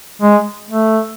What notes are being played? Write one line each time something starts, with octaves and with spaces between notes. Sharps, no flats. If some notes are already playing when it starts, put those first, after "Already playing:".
G#3
A3